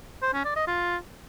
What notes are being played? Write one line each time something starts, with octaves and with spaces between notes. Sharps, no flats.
C5
C#4
D5
D#5
F4